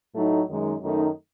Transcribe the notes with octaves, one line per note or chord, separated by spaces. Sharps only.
A2 F#3 A3 D#4
F#2 D#3 G#3 D#4
F#2 D#3 A3 D#4